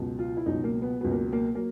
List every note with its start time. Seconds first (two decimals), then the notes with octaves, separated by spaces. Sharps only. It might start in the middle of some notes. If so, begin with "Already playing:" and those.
Already playing: C#2 B2 F#3
0.19 F4
0.37 E4
0.46 C#2 B2 F#3 D#4
0.64 A#3
0.82 B3
1.01 C#2 B2 F#3 B3
1.12 A#3
1.33 A#3
1.55 F#3 A#3